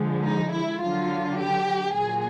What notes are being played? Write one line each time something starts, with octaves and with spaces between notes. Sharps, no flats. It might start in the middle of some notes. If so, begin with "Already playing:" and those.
Already playing: D3 F3 G#3
D#4
E4
D3 F#3 F4
G4
A#2 F#3 G#4